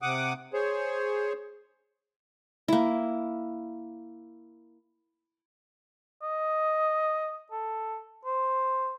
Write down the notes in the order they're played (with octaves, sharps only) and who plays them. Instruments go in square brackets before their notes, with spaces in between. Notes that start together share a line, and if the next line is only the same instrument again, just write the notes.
[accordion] C3 F#5 D6 D#6
G#4 C5 C#5
[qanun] A#3 E4
[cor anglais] D#5
A4
C5